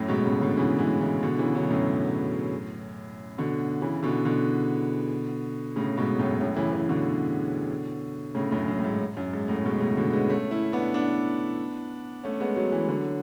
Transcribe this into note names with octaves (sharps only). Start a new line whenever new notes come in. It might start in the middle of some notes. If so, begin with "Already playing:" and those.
Already playing: F#2 A2
G#2 B2
A2 C#3
B2 D3
C#3 E3
E3 G#3
C#3 E3
B2 D3
C#3 E3
D3 F#3
B2
F#2 A2
B2 D3
C#3 E3
B2 D3
B2 D3
A2 C#3
G#2 B2
F#2 A2
F#2 A2
C#3 E3
C#3 E3
B2 D3
A2 C#3
F#2 A2
F#2
A2
G#2
F#2
G#2
F#2 A2
G#2 B2
A2 C#3
B2 D3
G#3 B3
A3 C#4
C#4 E4
B3 D4
B3 D4
A3 C#4
G#3 B3
F#3 A3
E3 G#3
D3 F#3